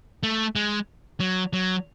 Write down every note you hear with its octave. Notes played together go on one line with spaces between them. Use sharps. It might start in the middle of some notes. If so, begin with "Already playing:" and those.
A3
G#3
F#3
F#3